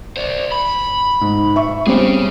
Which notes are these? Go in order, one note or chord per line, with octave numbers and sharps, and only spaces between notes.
C5 D5
B5
G#2
E5 C#6
G3 C4 C#4 G#4 C#5